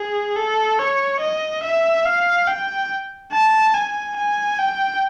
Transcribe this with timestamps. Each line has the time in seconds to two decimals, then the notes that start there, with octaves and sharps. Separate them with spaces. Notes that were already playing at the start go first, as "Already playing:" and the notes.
Already playing: G#4
0.37 A4
0.79 C#5
1.20 D#5
1.64 E5
2.06 F5
2.47 G5
3.32 A5
3.74 G#5
4.17 G#5
4.59 G5